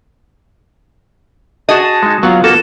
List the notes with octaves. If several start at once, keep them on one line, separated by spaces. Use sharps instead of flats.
F#4 G#4 D#5 A5
A5
G#3 D#4
F#3 B3 F4 F5 F#5
A#3 F#4 A4 E7